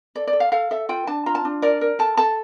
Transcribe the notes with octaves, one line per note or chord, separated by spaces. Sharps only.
A4 D5
D5
A4
F5
A4 F5
A4 E5
F4 G5
D4 A5
F4 A#5
A5
D4
A#4 D5
A#4
A4 A5
A4 A5